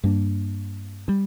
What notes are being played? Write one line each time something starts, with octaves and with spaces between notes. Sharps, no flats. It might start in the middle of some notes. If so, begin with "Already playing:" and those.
G2 G3 A#3 D4
C3 G3